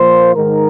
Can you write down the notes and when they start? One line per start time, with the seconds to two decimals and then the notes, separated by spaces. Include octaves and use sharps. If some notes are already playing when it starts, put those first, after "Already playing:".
Already playing: A#2 F3 A#3 C5
0.34 G#2 D#3 G#3 A#4